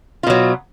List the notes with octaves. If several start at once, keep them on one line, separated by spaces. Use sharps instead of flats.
B2 F#3 F4